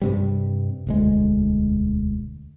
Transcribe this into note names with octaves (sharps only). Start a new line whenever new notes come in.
G2 C3 G3
E1 D2 G#3